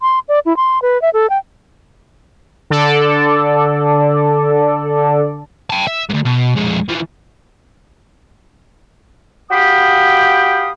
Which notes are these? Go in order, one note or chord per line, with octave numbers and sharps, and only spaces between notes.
C6
D5
E4
C6
B4
E5
A4
G5
D3 A4 D5
G5 A5
E5
D2 G#2
B2
F2 G#3
E3 F3
F#4 G4 F5 G5 B5 D#6